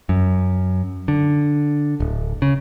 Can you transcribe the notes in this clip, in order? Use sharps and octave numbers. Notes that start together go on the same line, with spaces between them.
F#2
D3
D1
C#3